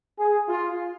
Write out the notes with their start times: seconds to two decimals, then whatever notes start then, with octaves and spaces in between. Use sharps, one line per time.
0.19 G#4
0.49 F4